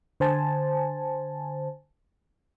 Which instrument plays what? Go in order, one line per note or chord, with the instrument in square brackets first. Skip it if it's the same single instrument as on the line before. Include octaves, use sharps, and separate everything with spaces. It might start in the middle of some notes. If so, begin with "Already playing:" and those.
[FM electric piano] D3 C5 G#5 A5